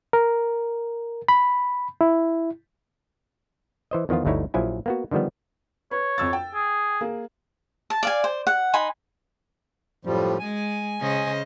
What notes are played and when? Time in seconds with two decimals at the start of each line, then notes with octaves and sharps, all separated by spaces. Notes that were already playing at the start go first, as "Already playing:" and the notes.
0.13 A#4
1.28 B5
2.01 E4
3.91 E3 C5 D#5
4.09 E2 D#3 F3 B3 F4
4.25 G1 D2 A3 D#4 E4 C#5
4.54 A#1 F3 F#3 E4 G#5
4.86 A#3 B3 F#4
5.11 D3 D#3 F3 G3 B3
5.91 B4 C#5
6.18 F2 E6 A6
6.33 G5
6.55 G#4
7.01 A#3 G#4
7.90 A5
8.03 D5 F5 G#5
8.24 C5
8.47 F#5
8.74 D#4 G#5 B5 C6
10.05 F#2 A2 F3 G3
10.39 G#3 G#5
11.00 C#3 C5 D#5